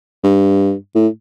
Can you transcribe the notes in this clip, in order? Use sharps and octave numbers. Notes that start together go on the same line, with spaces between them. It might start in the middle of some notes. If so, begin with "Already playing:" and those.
G2
A2